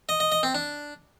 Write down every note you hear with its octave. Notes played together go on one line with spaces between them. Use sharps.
D#5
D#5
D#5
C4
D4